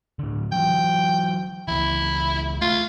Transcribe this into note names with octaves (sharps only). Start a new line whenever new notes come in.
A2 D3
E3 F#3 G5
C#2 E3 E4
A3 F4